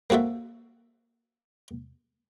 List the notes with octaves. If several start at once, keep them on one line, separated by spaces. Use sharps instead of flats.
A#3 C4 F#4 A4 E5